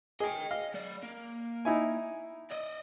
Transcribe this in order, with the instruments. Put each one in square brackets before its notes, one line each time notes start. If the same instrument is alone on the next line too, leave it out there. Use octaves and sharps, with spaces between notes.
[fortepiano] G#4 [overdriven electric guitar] D#5 G5
[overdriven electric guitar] D#5 [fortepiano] F5
[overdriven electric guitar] F#3 D5
A#3
[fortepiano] D#4 E4 G#5
[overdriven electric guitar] D5 D#5